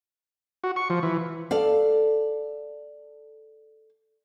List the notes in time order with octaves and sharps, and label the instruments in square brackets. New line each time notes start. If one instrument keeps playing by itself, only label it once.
[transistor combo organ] F#4
C#6
F3
E3
[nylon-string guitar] A4 D5 F5